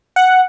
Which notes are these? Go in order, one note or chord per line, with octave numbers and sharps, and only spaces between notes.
F#5